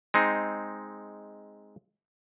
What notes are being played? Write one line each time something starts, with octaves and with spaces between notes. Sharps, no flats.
G#3 C4 D#4